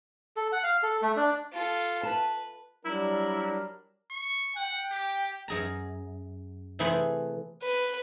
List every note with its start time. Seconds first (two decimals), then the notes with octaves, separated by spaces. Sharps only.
0.36 A4
0.52 F#5
0.63 F5
0.83 A4
1.02 A3
1.17 D4
1.53 F4 A4
2.03 B4 A5
2.85 F#3 G3 D4 E4 A#4
4.10 C#6
4.57 F#5 G5
4.91 G4
5.48 F#2 G#4 A#5
6.79 C3 E3 A3 G#4 C5 B5
7.63 B4